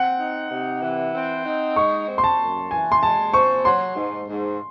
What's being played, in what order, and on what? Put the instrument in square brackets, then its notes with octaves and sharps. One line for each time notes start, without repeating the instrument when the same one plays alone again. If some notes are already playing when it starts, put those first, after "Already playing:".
Already playing: [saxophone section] C4 [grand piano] F#5
[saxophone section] D#4
C3
E3
C4
D#4
[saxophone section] G#3 [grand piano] C#6
[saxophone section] C4
[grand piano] C6
A5
[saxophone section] F#2
[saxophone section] E3 [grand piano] G#5
[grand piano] C6
[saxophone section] G#3 [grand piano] A5
[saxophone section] C4 [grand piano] C#6
[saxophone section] F#3 [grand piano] C6
[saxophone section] G#2
G#2